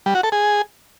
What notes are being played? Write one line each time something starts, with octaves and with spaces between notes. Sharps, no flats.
G3
F#4
A4
G#4